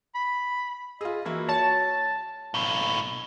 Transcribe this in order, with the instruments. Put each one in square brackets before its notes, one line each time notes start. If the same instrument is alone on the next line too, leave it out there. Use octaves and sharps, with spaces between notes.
[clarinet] B5
[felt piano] F4 G#4 [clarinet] D#5
[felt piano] E3 A#3 E4 [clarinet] F#4
[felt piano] C#5 [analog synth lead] A5
[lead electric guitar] B1 A2